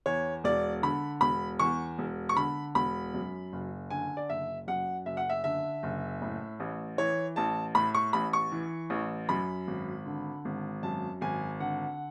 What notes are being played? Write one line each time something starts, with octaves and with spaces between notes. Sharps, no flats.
E2 C#5
E1 D5
D3 B5
E1 B5
E2 C#6
E1
C#6
D3 B5
E1 B5
F#2
F#1
D3 G#5
D5
F#1 E5
F#2 F#5
F#1 E5
F#5
E5
D3 E5
F#1
A2
A1
E3 C#5
A1 A5
A2 B5
C#6
A1 B5
C#6
E3
A1
F#2 B5
G#1
D3
G#1
F#2 A5
G#1 G#5
D3 F#5